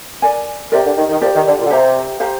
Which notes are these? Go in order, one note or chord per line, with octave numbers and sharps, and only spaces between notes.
A#4 D5 G#5
C3 G4 A#4 D5
D3
D#3
D#3
F3 G4 A#4 D5
D#3
D3
A#2
D3
C3 G4 C5 F5 A#5
G4 C5 F5 A#5